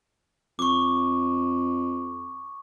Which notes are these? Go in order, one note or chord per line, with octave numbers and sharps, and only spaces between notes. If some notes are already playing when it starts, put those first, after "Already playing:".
F2 C#6 D6